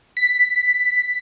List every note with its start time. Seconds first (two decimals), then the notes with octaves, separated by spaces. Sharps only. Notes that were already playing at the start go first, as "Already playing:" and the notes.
0.17 B6